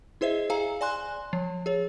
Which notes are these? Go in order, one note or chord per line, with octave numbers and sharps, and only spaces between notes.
E4 G#4 C5 D#5 E5
G#4 F5 G#5 A#5
D5 G#5 C6 F#6
F3
G#4 C#5